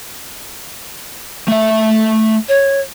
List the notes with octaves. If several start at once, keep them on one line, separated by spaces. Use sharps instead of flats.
A3 E5
C#5